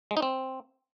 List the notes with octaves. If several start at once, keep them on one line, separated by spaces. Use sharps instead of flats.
G#3
D#4
C4